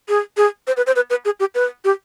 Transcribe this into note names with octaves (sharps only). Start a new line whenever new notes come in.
G#4
G#4
C5
B4
C5
B4
B4
G#4
G4
B4
G4